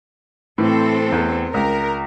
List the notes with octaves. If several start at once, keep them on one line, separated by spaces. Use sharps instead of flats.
A2 E3 A3 C4 A4
E2
C#2 A#4